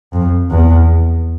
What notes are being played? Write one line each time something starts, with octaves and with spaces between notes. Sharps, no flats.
F2
E2